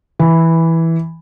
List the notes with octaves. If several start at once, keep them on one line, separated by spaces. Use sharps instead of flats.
E3